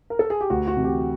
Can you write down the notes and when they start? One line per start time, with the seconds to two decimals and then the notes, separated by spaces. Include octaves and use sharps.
0.10 A#4
0.19 A4
0.30 G#4
0.41 G4
0.50 D2 F#4
0.68 F#4
0.76 C3 E3
0.84 G4